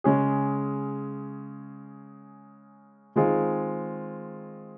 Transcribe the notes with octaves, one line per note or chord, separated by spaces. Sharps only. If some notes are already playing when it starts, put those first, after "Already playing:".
C#3 G#3 C#4 G#4
D#3 G#3 C4 F4 G#4